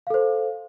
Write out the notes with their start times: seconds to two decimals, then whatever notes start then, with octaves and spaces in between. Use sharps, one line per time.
0.07 F5
0.10 A4
0.14 C5